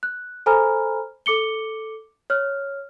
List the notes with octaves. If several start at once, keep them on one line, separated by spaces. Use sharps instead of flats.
F#6
A4 C5 G#5 A#5 B5 F6
A4 D6 C#7 G7
C#5 F6